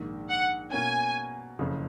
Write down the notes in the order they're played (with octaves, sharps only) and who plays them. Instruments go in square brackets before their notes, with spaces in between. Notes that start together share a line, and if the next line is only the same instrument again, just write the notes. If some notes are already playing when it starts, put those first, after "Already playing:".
Already playing: [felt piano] A#1 G#2 D#3
[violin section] F#5
[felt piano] B2 A#3 C#4 [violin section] G#5
[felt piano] F#1 F2 C#3